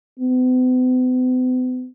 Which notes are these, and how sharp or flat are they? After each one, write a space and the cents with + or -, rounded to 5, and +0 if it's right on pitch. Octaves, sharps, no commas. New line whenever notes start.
B3 +45